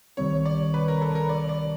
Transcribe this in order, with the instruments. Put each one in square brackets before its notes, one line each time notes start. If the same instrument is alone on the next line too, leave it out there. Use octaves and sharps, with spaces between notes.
[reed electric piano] C2 C3 D#3 G3 C4 [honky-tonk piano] C#5
[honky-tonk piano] D5
B4
A#4
A4
A#4
D5
D5